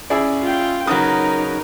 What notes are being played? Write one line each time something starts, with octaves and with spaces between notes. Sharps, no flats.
C#4 E4 G#4 D5
F4 G5
C#3 F#3 D#4 A#4 B4 D#6